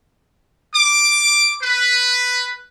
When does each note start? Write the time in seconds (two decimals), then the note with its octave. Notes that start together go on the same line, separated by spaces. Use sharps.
0.75 D6
1.62 B4